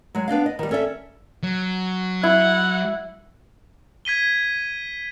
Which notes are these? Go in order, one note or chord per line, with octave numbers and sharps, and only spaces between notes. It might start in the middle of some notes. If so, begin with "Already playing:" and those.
F#3 G#3
B3 D4 D#5 F5
D#5
D#3 G3
C#4 A4 D5 E5
F#3
E4 F#5
G#6 B6 D#7 G7